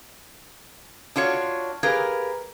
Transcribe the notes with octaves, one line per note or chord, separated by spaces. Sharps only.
D4 F4 F#4 C#5
G4 G#4 A#4 B4 F5